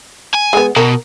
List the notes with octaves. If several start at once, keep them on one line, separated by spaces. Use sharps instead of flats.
G#5
G#3 B3
B2 A#4